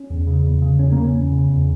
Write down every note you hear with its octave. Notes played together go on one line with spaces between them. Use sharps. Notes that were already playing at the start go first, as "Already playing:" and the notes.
Already playing: C#4
E2
C#3
E2
C#3
E2 C#4
C#3 A#3
C#4
E2
C#3
E2